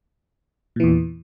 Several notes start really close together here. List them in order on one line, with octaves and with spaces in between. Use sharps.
A#2 E3 E2